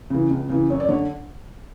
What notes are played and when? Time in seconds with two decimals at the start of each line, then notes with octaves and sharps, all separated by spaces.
0.10 C#3 E3
0.30 C#2
0.49 C#3 E3
0.70 F#2 C#5
0.80 D5
0.89 D3 C#5